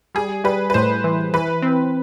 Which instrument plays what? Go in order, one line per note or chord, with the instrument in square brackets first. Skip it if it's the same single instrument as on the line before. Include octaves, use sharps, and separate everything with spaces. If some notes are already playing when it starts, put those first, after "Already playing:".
[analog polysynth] G3 [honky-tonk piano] G#4
[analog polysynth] G3 [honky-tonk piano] B4
[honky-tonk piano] B4
[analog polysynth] A2 [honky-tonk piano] C5
[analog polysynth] E3
[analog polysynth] E3 [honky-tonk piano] B4
[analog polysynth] C4